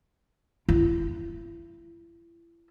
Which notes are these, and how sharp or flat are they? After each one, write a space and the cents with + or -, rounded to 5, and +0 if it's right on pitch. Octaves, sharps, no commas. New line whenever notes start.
E4 +35